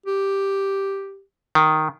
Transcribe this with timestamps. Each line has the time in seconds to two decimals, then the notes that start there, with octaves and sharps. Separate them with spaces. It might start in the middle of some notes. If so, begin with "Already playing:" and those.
0.06 G4
1.55 D#3